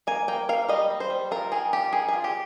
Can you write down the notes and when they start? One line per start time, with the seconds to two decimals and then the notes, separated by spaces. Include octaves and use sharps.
0.07 A#3 G#5
0.28 A#3 G5
0.49 A#3 F5
0.69 G3 D#5
0.90 G3
1.00 C5
1.10 G3
1.31 F4 A#4
1.52 D#3 G#4
1.73 F4 G4
1.93 D#3 G#4
2.09 F4 G#4
2.24 G4